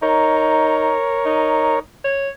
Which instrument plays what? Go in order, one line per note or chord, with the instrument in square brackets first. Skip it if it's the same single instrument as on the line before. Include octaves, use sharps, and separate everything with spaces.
[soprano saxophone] D#4 [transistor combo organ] A#4 C#5
[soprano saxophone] D#4
C#5